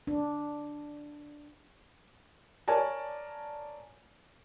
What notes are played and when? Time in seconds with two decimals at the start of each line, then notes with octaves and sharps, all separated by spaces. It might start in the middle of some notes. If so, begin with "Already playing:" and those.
0.07 D4
2.68 A#4 C#5 D5 G#5 A5